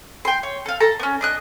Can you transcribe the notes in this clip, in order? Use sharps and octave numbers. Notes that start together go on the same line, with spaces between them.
G5 C6
C#5
A4 F5
A4 A5 A#5
B3 C#4
D4 D#5 F#6